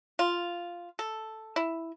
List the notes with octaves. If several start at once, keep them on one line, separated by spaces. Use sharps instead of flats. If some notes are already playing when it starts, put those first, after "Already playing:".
F4
A4
E4